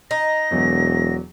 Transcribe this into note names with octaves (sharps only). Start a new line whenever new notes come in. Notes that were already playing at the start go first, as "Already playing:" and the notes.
D#4 A#6
E1 E2 F#3